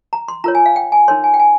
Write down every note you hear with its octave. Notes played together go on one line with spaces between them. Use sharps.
A#5
C6
F4 A#4 C#5 A#5
G#5
F5
G5
G#5
D#4 A#4 C#5 C6
G#5
G5
G#5